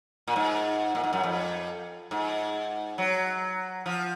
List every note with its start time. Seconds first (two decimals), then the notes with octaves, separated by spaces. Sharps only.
0.28 A#2
0.36 G#2
0.95 A#2
1.04 G#2
1.13 F#2
1.23 F2
2.11 G#2
2.98 F#3
3.86 F3